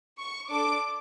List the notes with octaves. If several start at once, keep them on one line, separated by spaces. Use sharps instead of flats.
C#6
D4 A4 D6